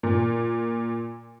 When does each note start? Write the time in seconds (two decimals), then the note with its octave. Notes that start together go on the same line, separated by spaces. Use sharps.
0.03 A#2